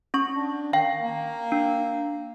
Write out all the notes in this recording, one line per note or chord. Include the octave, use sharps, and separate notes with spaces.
C#4 C#6
D4
D#3 F5 G5
A#3
D4